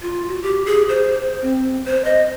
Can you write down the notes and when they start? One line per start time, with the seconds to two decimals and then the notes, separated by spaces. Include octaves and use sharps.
0.02 F4
0.28 F#4
0.43 G4
0.66 G#4
0.89 C5
1.42 C4
1.85 C5
2.05 D#5